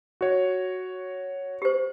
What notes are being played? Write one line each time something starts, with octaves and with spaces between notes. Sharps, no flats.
F#4 C#5
G4 C5